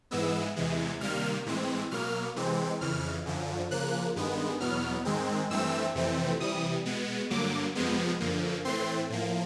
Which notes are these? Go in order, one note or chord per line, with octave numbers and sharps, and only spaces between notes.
G#2 E3 G#3 B3 E6
E2 C3 E3 G#3
C3 D#3 G3 A#3 F6
A2 E3 G#3 C4
B2 F#3 A#3 F6
C3 E3 G#3 C4
F2 C#3 E3 F6
F#2 D3 F3
C#3 F3 A#3 F#6
G2 D#3 G#3 B3
E2 B2 F#3 B3 F6
G#2 D#3 G#3 C4
G2 E3 A3 C4 E6
F2 C3 E3 A3 C4
C3 E3 G3 D#6
B2 G#3 B3
G2 D3 F#3 A#3 D6
F2 C3 F3 G#3 B3
F#2 D3 F3 A#3
A2 E3 A3 C4 C6
A2 F3 A#3